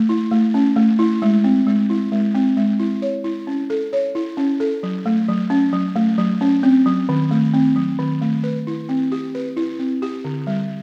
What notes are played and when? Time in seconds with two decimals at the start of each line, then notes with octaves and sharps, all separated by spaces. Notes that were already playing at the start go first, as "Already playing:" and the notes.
Already playing: A3
0.09 E4
0.31 A3
0.54 C#4
0.76 A3
0.99 E4
1.22 G#3
1.44 C4
1.67 G#3
1.90 E4
2.12 G#3
2.35 C4
2.57 G#3
2.79 E4
3.02 C#5
3.24 E4
3.47 C#4
3.70 A4
3.93 C#5
4.15 E4
4.37 C#4
4.60 A4
4.83 F#3
5.06 A3
5.28 F#3
5.50 C#4
5.73 F#3
5.96 A3
6.18 F#3
6.41 C#4
6.63 C4
6.86 F#3
7.09 D#3
7.31 A3
7.54 C4
7.76 F#3
7.99 D#3
8.21 A3
8.44 B4
8.67 E4
8.89 C4
9.12 G4
9.35 B4
9.57 E4
9.79 C4
10.02 G4
10.25 D3
10.47 G3